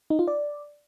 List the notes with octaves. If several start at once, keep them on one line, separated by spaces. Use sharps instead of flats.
D#4
F4
D5